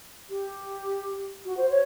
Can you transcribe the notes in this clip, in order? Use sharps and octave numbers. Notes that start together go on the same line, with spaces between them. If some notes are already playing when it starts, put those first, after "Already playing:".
G4
F#4
C5
C#5